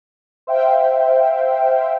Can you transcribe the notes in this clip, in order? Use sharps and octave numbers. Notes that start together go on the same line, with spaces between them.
C5 E5 F5 G5